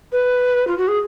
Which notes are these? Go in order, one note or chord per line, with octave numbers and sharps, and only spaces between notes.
B4
F4
F#4
G#4